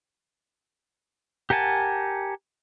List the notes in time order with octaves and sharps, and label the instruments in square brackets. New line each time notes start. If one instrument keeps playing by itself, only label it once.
[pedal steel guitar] G4 A#4 F#5 G#5 A5